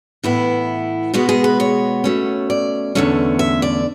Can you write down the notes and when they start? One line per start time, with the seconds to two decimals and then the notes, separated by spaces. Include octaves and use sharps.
0.24 A2 E3 B3 E4
1.14 B2 G#3 B3 F#4
1.29 G#4
1.44 B4
1.60 C#5
2.04 B2 A3 C#4
2.50 D5
2.95 E2 D3 A3 C#4
3.39 E5
3.62 D5